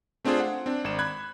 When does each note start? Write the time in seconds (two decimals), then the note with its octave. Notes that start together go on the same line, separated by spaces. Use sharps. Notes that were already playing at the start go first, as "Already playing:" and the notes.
0.25 A3 C4 D4 F4 G#4 C5
0.40 F#5
0.66 C4 D4
0.84 G#1 D5 E7
0.99 B5 F#6 G#6